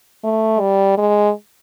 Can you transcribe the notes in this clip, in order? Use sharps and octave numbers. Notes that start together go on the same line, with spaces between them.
A3
G3
G#3